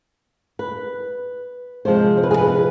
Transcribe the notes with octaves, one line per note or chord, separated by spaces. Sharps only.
B4
C3 F3 G#3 C5
C5
B4
G#4
B4
B4